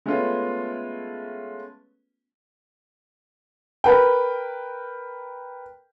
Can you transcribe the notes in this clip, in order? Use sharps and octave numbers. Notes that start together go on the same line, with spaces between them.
G#3 A3 B3 C#4 F4
A#4 B4 G5